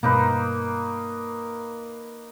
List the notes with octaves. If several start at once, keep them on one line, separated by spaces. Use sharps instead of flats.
G2 B2 A#3 D#4 B4